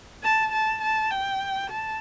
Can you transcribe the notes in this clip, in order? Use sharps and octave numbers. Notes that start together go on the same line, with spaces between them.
A5
A5
A5
G5
A5